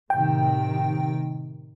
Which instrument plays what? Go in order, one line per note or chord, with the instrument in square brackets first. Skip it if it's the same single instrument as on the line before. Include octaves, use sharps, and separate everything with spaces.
[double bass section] A2 C3 D#3 [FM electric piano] G5